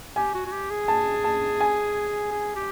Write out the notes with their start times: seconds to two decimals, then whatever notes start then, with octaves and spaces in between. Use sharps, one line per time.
0.16 G4 G#5
0.34 F#4
0.46 F#4
0.52 G4
0.70 G#4
0.88 A5
1.24 A5
1.61 G#5
2.31 G#4
2.56 G4